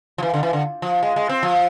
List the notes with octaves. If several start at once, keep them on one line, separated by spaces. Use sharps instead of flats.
F3
E3
D3
E3
D3
F3
G#3
G#3
C4
F3